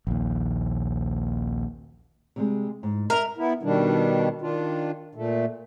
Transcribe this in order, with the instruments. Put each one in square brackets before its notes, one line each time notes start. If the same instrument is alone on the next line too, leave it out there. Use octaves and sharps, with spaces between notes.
[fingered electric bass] A#1 D#2
[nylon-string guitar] C3 G3 G#3
G#2
[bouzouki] A#4 [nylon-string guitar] D#5 E5
[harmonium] B3 E4
B2 D#3 G3 D4
D#3 D4 F4
A#2 A3